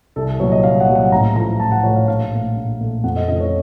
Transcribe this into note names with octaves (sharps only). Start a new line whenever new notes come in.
C2 A4
A#2 F#3 C#5
D#5
C2 F5
F#5
A#2 F#3
F#5
A1 A#5
A2 F3 A3 A#5
A1 A5
F#5
A2 F3 A3 C#5
F5
A#1 F5
A#2 A3
A#1
A#2 A3
F2 F#5
D#5
C#3 F3 A3 D#5
C#5